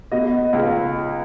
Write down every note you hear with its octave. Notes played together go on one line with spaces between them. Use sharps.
B2 D#5
C#2